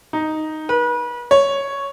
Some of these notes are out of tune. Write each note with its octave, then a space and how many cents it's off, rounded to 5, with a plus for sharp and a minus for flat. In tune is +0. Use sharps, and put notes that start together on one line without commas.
D#4 +0
B4 -35
C#5 +0